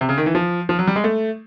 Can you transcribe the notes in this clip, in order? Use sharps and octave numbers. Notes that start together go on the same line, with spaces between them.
C3
C#3
D#3
E3
F3
F3
F#3
G3
G#3
A3